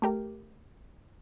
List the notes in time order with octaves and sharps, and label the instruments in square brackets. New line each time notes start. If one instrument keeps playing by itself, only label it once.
[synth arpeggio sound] A3 G4 A#4